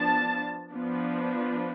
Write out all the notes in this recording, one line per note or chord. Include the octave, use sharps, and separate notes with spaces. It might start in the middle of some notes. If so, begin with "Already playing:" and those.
Already playing: F3 B3 D4 A5
F3 B3 D4